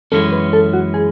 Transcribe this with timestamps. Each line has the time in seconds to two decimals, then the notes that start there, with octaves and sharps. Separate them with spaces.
0.12 F#2 E3 G#3 C#4 A4
0.32 B4
0.53 A4
0.73 F#4
0.94 G#4